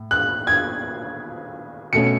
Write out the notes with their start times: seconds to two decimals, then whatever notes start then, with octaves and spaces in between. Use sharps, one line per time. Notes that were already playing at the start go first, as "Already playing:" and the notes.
Already playing: A2
0.11 F#6
0.47 G#6
1.93 B2 A3 C#4 C#7